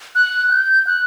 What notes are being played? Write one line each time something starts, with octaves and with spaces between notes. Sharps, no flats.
F#6
G6
F#6